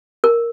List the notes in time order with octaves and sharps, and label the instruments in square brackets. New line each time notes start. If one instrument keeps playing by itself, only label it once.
[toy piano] A#4